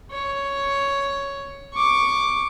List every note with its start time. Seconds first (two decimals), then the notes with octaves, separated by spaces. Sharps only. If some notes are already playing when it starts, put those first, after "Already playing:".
0.11 C#5
1.73 C#6 D6